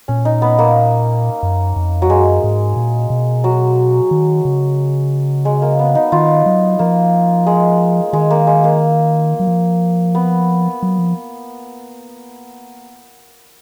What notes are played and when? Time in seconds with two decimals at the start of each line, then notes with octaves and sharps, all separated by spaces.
0.08 A#2 C#4
0.25 D#4
0.42 B3
0.59 A#3
1.43 F#2
1.76 F2
2.02 F#3
2.09 F#2 G#3
2.44 G#2
2.76 A#2
3.10 B2
3.44 F#3
4.11 D#3
4.45 C#3
5.45 G#3
5.62 A#3
5.79 B3
5.95 D#4
6.12 D#3 F4
6.46 F#3
6.79 F3 A#3
7.46 G#3
8.13 D#3 G#3
8.30 A#3
8.47 G#3
8.64 A#3
9.40 F#3
9.47 F3
10.15 B3
10.83 F#3
10.99 F3